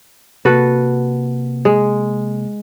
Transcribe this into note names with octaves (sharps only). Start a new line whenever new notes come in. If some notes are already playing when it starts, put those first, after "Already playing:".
C3 A#3 F#4 A4 B4
G#3